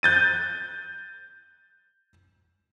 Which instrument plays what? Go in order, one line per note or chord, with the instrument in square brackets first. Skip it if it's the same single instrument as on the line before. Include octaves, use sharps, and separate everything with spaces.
[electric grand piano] F#6 G6 A6 D#7